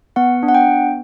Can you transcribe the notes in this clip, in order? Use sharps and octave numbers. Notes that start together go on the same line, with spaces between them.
B3 F#5
D4
F#5
G5
B3